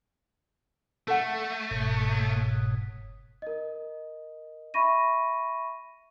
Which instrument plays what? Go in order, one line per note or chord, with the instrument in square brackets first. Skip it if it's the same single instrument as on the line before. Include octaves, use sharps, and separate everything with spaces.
[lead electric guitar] A3 [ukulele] A4 F#5
[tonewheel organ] F#1 G#2 B2
[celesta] A#4 D#5
E5 B5 C#6 A#6 D#7